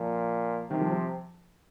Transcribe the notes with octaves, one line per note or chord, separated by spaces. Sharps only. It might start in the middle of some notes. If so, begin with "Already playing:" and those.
Already playing: A#2 F3
C3 D#3
F3
F3